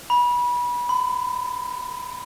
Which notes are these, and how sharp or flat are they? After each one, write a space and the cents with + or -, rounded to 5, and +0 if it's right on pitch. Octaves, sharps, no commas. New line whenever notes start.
B5 -25
B5 +35